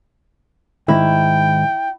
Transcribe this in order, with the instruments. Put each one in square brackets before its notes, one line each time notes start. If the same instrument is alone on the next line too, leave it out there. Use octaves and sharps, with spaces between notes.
[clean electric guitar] G#2 D#3 [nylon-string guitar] E4 [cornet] G5